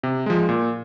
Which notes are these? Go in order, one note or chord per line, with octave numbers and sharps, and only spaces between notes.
C3
F3 G#3
A#2